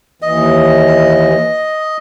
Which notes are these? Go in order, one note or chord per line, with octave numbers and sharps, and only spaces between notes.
D#2 E3 D#5